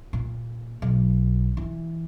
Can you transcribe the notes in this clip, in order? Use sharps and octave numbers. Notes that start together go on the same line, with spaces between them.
A#2
B1
E3